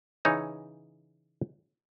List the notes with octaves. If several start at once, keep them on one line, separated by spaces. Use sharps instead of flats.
C#3 E3 D#4 C#5